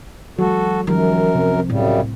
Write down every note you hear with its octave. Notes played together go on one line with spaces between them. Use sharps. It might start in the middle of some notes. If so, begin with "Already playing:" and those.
E3 F#3 G#3 F#4 A4
F#2 D#3 F3 G3 C#4 A#4
C2 C3
F#2 A2 C#3 G3